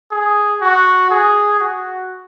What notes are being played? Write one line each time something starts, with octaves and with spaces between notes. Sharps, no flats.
G#4
F#4
G#4
F#4